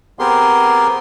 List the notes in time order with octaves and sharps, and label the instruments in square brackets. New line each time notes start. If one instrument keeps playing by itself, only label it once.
[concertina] B3 C4 G4 G#4 A#4 C6